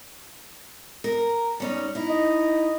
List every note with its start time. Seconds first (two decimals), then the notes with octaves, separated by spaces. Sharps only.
1.04 A#4
1.60 G3 C#4 D#4
1.95 D#4 E4
2.09 D#5